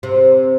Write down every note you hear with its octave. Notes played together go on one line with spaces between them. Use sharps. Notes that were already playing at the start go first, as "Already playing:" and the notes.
C3